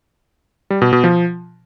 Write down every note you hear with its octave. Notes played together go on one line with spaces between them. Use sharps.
G3
B2
B2
F3